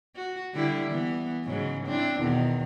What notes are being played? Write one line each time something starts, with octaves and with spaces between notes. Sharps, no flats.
F#4
D3 G3 E4
E3 B3
G#2 C#3 F#3
C4 D4 E4
E2 B2 D#3